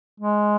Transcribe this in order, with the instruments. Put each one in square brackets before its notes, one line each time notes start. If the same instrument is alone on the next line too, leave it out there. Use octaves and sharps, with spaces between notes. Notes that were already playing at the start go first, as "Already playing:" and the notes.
[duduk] G#3